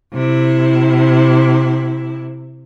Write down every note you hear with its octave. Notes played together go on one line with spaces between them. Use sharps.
C3 E4